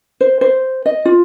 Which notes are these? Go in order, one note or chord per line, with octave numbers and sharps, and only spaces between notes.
C5
C5
D#5
F4